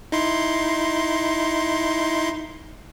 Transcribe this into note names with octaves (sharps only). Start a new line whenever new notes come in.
D#4 E4 C6